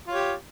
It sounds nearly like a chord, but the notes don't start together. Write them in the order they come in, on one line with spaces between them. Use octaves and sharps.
F4 C#5 G4